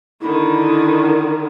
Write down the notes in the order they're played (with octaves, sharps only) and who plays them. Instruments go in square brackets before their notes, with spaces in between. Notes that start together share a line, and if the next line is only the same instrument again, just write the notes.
[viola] D3 D#3 [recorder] E4